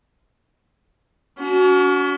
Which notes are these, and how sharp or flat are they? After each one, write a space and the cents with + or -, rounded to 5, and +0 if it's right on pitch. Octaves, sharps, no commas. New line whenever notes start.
C#4 +40 F#4 +0